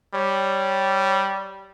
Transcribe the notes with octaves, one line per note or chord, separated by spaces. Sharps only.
G3 C#5